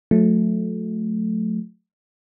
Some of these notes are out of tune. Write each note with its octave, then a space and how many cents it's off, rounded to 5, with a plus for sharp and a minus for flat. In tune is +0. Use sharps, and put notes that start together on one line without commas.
F#3 -45 A3 -10